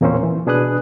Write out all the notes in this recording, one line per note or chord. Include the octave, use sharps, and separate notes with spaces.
E2 A#2 A#3 C4 C#4 C5
E3
B2 D4 G#4 B4 D#6 F#6